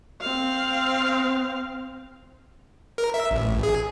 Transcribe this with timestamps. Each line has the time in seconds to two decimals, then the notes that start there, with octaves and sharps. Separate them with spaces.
0.21 C4 F5
2.98 A#4
3.14 E5
3.31 A1
3.63 G#4